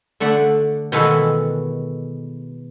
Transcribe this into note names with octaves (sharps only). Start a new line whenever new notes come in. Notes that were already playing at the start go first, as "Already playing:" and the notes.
D3 A3 D5 F#5
B2 D#3 E3 G#3 A4 F#5